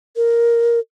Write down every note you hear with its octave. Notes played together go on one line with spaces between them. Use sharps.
A#4